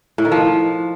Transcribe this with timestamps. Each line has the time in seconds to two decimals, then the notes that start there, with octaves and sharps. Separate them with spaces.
0.18 A2
0.25 D#3
0.32 F3